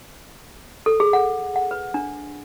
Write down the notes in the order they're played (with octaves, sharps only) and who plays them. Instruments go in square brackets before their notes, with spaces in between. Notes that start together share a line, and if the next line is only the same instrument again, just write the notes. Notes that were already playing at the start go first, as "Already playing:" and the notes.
[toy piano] A4
G#4
F#5
F#5
B4
D4